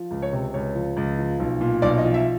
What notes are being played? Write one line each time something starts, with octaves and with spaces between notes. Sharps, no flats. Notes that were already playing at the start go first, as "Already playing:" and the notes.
Already playing: F3
C#2
C#5
C3
C#2 C#5
F3
C#2
F3
B1
A#2
B1 D5
D#5
F3
E5